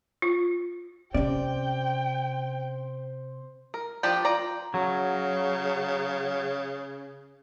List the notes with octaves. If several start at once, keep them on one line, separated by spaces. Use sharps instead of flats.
F4
C3 C#4 C5 D5 G5
A#4
F3 D4 G4 D5 G5
F4 D5 A#5
C#3 F#3